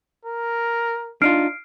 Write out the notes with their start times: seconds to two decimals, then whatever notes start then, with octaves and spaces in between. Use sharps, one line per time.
0.25 A#4
1.22 D4 D#4 F4 F6 C7 D7